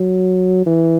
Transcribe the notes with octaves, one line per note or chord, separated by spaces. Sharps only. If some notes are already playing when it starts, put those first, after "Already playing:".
Already playing: F#3
E3